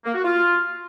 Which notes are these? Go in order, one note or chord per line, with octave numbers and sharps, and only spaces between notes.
A#3
F#4
F4